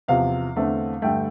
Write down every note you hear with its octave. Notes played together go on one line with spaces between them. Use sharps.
E2 C3 F3 F5
E2 D3 A3 C4
G2 D3 A3 G5